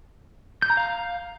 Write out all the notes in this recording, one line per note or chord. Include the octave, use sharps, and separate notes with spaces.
G6
A#5
F5